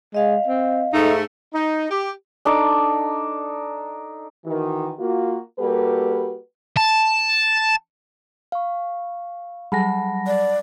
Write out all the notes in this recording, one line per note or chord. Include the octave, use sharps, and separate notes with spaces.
G#3 D#5 F5
C4
G#2 A3 D#4
D#4
G4
D4 D#4 A4 D6
D#3 E3 F#4
A#3 F4 F#4
G3 A#3 F#4 G4 A4 B4
A5
F5 C#6
F#3 G3 F#5 A5 B5 A#6
D5